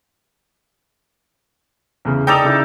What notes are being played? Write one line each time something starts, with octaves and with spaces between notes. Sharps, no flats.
E2 C#3
D#4 A4 D5 G5 D#6 F7
C#3 E4